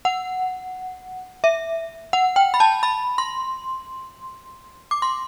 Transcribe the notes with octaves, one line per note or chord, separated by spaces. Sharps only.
F#5
E5
F#5
G5
B5
A5
B5
C6
D6
C6